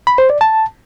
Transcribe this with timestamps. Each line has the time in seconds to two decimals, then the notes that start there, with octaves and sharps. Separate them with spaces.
0.07 B5
0.18 C5
0.30 D5
0.41 A5